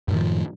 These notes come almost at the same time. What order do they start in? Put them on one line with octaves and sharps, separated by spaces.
F#2 A2 D#3 F3